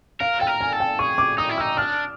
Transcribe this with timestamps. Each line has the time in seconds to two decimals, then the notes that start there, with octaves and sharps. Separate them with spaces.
0.21 A#4 F5
0.41 A4 G5
0.47 A#4
0.61 G#5
0.73 A4
0.80 G5
0.99 G#4 C#6
1.18 D6
1.38 D#4 D#6
1.49 E4
1.58 D#4 E6
1.77 D4 F6